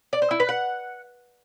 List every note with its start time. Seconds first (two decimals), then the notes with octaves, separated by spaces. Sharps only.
0.13 D5
0.22 C5
0.31 E4
0.40 B4
0.49 F#5